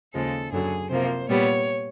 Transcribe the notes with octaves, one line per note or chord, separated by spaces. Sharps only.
D#2 C#3 F3 G#3 A4
F#2 D3 F#3 G#4
C3 F3 A#3 C5
A#2 G3 B3 C#5